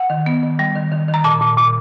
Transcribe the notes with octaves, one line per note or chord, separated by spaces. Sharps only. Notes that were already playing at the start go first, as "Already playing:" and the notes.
Already playing: F#5
D#3
B3
D#3
G3
D#3
D#3
D#3
A#5
A#2 A5
A#2
A#2